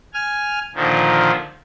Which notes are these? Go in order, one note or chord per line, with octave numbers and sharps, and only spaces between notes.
G#5 F6
A#2 D3 D#3 F3